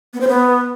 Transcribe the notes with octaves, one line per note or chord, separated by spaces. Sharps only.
B3
C5
B3